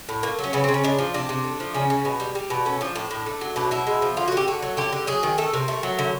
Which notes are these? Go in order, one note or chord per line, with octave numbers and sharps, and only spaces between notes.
A2
A3 A#3
F#3
C#4
C#3 B3
C#3 C4
C#4
G#3 D4
F3
C3 D4
C3
A3
F3
C#3 C#4
C#3
B2
G3
G3
B2
A3 C#4
F3 D4
A2 D4
A2
A3
F#3
B2 D4
B2 E4
G#3
F3
D3 F4
F#4
D3 G4
A3 F#4
F#3
D3 G4
D3
F#3 G#4
D#3
A3 A4
C3 A#4
A3
F#3
D3